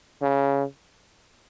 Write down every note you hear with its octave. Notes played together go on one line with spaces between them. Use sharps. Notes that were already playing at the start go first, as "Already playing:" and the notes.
C#3